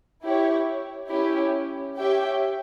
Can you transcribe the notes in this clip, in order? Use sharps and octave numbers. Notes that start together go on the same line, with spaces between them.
E4 G4 C#5
C#4 E4 G4 C#5
G4 C#5 E5 G5